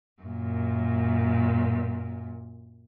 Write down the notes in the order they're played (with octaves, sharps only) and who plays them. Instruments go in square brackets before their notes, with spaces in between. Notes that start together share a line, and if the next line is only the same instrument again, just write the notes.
[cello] F#2 A#2